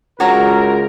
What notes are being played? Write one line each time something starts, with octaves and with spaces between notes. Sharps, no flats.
C#2 F#4 A#4 C#5 A#5